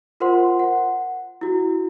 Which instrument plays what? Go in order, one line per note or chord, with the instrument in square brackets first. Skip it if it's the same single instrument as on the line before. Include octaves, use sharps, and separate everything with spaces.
[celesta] F4 A#4 C5 F#5 C6
F#5
E4 F#4